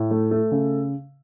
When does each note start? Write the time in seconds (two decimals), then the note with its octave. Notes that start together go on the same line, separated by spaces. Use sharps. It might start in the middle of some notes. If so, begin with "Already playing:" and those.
Already playing: A2
0.11 A3
0.31 A3
0.51 C#3